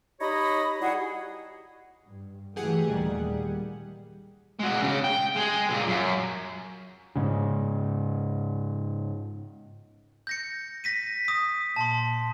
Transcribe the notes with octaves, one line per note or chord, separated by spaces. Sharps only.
D#4 G4 C#5 D#5 A#5 B5
G3 E4 F#4 G#4 D#5 F#5
G2
E3 F#3 A3 G4 G#4 F#5
D#1 A#2 D#3 G3
G#3 F#4
C#3 C#4
G5
G#3 G#4
A#2 C#3
F#2
G#2 C#3
G6 A#6 C#7
A#6 B6 D#7
D#6 B6
A#2 A5 C6